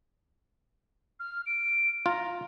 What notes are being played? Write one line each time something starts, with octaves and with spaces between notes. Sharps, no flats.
F6
D7
F4 A#5